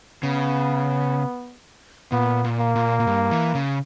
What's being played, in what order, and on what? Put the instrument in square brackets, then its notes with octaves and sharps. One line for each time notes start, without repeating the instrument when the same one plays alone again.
[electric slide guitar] C#3 [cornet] B3
[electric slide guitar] A#2 [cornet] B3
[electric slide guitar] A#2
[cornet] A#3
[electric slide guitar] A#2
A#2
G2
E3
C#3